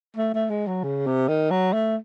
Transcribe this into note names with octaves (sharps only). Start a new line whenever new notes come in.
A3
A3
G#3
F#3
C#3
C3
D#3
F#3
A3